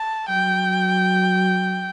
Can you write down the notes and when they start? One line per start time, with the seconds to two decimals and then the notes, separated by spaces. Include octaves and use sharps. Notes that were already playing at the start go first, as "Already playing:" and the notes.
Already playing: A5
0.29 F#3 G5